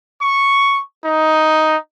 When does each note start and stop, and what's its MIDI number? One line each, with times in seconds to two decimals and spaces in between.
0.21 0.80 85
1.04 1.76 63